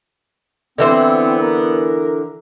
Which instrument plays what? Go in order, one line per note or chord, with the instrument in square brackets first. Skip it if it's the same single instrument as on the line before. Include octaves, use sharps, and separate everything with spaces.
[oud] D3 E3 C5 [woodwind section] B3 [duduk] C4
[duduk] A#4